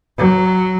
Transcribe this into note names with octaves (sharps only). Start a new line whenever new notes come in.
F#3